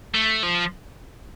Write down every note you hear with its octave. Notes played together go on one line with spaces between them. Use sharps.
A3
F3